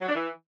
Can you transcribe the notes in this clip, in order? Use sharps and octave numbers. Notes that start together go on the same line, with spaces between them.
F#3
D4
E3